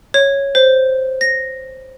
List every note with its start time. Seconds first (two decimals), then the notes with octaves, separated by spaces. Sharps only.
0.14 C#5
0.55 C5
1.21 A#6